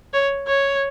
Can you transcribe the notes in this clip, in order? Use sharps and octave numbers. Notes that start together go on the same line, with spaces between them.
C#5
C#5